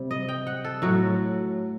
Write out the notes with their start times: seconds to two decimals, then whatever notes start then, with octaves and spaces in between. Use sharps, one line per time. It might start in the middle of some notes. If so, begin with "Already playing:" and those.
Already playing: C3 G3
0.11 D#5
0.28 G5
0.47 F#5
0.64 A4
0.82 A2 F#3 F#4